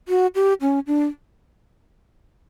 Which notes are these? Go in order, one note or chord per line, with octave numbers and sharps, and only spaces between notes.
F#4
G4
C#4
D4